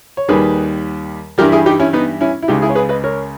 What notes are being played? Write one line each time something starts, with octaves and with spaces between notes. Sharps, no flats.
C#5
D#2 D#3 G3 G#4 B4
G2 E3 G3 G4 A#4
E4 G#4
D#4 G4
C#4 E4
B3 D#4
C#4 E4
E4
C#2 C#3 G#3 D#4 G4
E4 G#4
C#5
G#4 B4
B4 D#5
A#4 C#5